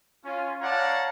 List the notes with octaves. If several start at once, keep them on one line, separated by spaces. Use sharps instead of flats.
C#4 F4
C#5 D5 F5 F#5 A5 A#5